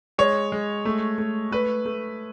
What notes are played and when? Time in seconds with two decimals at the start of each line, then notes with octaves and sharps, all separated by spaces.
0.18 G#3 C#5
0.52 G#3
0.85 A3
1.18 A3
1.51 A3 B4
1.85 A3